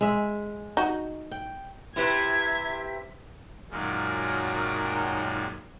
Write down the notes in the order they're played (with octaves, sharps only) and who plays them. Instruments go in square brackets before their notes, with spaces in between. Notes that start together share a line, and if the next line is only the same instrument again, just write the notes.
[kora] G#3 E5
[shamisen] D#4 F#4
[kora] G5
[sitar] C3 E4 [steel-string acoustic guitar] G4 B4 [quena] E5 [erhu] G#6
[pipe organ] F#2 A#2 G#3 [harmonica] D#3 F#3 A#4